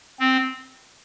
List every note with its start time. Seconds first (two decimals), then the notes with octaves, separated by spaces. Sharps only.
0.20 C4